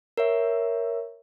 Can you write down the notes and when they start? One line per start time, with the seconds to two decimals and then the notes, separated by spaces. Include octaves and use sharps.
0.17 A#4 C#5 E5